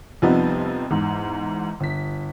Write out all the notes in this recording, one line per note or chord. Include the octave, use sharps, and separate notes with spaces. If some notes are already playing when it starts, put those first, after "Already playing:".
F2 C3 F3 G3 B3 D#4
E2 G#2
G1 B6